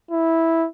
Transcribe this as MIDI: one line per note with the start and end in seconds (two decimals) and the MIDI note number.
0.11 0.67 64